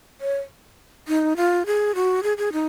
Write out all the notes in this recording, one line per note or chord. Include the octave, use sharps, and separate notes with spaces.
C#5
D#4
F4
G#4
F#4
G#4
G#4
D#4